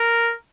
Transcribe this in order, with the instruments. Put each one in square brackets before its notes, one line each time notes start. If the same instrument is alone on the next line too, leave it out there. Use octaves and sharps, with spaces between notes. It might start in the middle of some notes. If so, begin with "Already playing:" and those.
Already playing: [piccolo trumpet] A#4